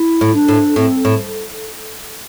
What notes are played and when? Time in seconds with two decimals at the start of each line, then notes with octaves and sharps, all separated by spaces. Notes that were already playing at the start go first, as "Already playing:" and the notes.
Already playing: E4
0.21 A2
0.35 D4
0.48 A2
0.76 A2 C4
1.05 A2